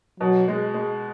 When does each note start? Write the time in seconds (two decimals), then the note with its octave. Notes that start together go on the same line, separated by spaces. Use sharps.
0.20 B2 F#3
0.48 G#3
0.74 G#3